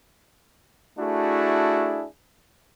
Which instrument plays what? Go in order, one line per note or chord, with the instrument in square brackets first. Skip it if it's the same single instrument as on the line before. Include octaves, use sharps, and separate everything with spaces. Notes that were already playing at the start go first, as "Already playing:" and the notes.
[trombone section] A3 D4 E4 F#4 G#4